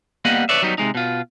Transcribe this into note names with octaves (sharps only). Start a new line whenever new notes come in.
G3 A#3 B3 D#5 F#5
B4 C#5 D5 E5
F#3 G3 B3 D#4
C3 G#3 D#4
B2 F4